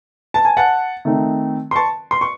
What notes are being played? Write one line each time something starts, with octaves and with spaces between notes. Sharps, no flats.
A5
G#5
F#5 A5
D#3 A3 C4 D#4
C6
A5 C#6
C6
C#6